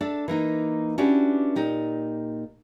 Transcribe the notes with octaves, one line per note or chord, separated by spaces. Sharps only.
D4 A4 E5
E3 A#3 D#4
C#4 D4 E4 F#4 G4 B4
A#2 D#4 G4